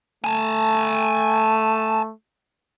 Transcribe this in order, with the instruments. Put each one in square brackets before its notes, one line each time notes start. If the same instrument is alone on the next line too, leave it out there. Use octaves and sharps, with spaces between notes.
[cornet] A3 [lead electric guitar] G#5 A5